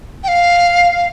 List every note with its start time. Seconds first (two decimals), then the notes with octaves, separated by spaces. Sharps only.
0.24 G5
0.28 F5